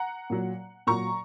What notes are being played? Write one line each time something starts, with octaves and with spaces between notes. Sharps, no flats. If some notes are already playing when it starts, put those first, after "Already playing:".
Already playing: F#5 A#5
A#2 F#3
A#2 F#3 A#5 C#6